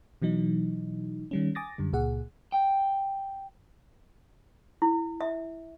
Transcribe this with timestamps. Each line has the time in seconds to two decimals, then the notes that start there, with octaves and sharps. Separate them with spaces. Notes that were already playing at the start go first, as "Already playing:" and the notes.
0.22 B2 E3 F#3 D#4
1.31 D#3 G3 C#4
1.55 G#5 D6 D#6 A6 A#6
1.78 F#2 D3 G3
1.93 C#2 A#2 G#4 F#5
2.52 G5
4.82 E4
5.21 E5